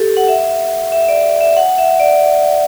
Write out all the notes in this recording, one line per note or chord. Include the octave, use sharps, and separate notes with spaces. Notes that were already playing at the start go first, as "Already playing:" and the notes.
Already playing: G4 A4
F#5
E5
E5
E5
D5
E5
F#5
E5
D5